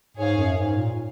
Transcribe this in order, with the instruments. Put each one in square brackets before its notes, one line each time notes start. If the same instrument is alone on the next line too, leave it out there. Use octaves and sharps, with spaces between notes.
[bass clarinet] G#2 [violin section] G#4 C#5 F5 G#5
[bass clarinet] F#2
G#2
A#2